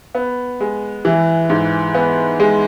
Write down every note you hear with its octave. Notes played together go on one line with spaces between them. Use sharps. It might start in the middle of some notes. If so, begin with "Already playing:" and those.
B3
G#3
E3
G#2
B3
G#3